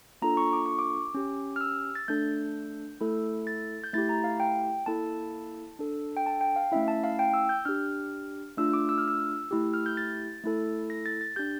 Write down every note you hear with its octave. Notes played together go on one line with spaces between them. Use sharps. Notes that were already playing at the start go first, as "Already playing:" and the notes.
A#3 D4 F4 A4 A#5
C#6
D6
C#6
D6
C#4 G4
F6
E6
A6
A3 D4 A4 G6
A3 E4 A4
A6
G6
A3 E4 G4 A6
A#5
F5
G5
A#3 E4 A4 A5
D4 A4
G5
A5
G5
F5
A3 C#4 E4 E5
A5
F5
G5
E6
G6
D4 G4 F6
A3 D4 F4 E6
D6
E6
F6
E6
A3 E4 G4
F6
G6
A6
A3 E4 A4
A#6
A6
A6
D4 G4 G6